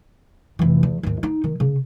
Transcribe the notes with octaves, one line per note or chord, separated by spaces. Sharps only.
F1 E3
E2
D#2 G#2
D#4
D#3
C#3